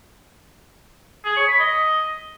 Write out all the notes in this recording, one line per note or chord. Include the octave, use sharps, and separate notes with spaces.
G#4
C#5
B5
D#5